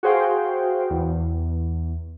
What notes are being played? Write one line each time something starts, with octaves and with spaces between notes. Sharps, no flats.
F#4 G#4 C5 F5 G5
E2